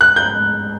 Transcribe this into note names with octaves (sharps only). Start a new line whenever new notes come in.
F#6
G6